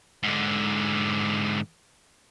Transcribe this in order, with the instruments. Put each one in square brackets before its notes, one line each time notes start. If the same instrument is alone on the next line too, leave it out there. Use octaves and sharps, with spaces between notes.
[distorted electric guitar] G#2 D3